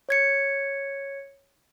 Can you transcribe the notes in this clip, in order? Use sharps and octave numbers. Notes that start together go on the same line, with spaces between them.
C#5 G#6 C#7